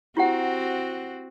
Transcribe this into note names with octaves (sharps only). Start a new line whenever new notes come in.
C4 E4 F#4 G4 F#5